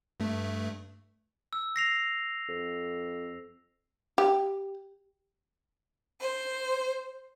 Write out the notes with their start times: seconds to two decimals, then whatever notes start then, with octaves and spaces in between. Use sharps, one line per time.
0.20 G2 A3
1.53 E6
1.76 A#6 C7 F7
2.49 F2
4.18 G4
6.22 C5